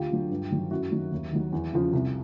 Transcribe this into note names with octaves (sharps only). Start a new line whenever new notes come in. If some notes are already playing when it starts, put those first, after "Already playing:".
Already playing: D2 F4 G4
D3 F#3
G2
D#3 F#3
F#2 E4 F#4
D#3 F#3
D#2
D#3 F#3
E2
C#3 F3
C2